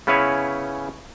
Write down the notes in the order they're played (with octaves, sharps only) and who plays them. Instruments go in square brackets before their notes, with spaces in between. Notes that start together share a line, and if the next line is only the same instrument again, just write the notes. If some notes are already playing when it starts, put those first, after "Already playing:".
[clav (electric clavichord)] C#3 B3 C#4 E4 B4 C#5